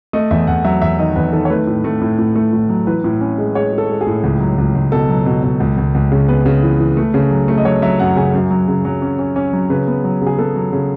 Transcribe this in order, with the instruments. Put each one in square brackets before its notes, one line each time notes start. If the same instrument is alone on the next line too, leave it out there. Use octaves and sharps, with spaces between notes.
[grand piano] A3 D#5
E2 E5
E2 F#5
F#3 E5
E2 E5
D#3 D#5
E2 B4
D#3 A4
C#5
A3 B4
A2
A3
A2
A2
A3
A2
F#3
E3 B4
A2
C#4
G#3
G#3 C#5
G#3
A4
G#3
G#4
A2
C#2
F#3
C#2
C#2
B2 A4
F#3
B2
B2
C#2
C#2
C#2
C#3
B3 B4
C#3
E3
E3
A3
C#3
F#3
A3
D#5
F#3 C#5
F#3 E5
F#2 F#5
C#3 G#5
F#2
F#3
C#3
F#3
C#4
C#4
C#4
F#3
C#3 B4
B3
F#3
C#3
G#4
B3 A4
F#3
C#3